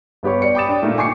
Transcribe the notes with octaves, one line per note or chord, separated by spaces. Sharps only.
G2 B3 G4 C#5 C#6
D5 C#7
G5 B5 D6 D#6 A6 E7
D4
A#2 A3 A#3 D#4
G5 G#5 C#6 D6 C7 C#7